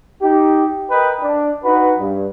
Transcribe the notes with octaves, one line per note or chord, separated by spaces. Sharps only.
D#4 G4
A#4 B4 D#5 G5
D4
D#4 F#4 B4
G2